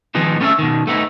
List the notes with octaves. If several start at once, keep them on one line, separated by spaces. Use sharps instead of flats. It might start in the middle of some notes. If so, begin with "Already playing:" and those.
D#3 F3 G#3 B3 D#4
A3 B3 C#4 G#4 A4 E5
B2 D#3
A3 B3 C4 D#4